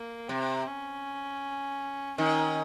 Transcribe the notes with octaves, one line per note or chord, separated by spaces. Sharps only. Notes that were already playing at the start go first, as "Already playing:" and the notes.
Already playing: A#3
C3 C4
C#4
D#3 C#4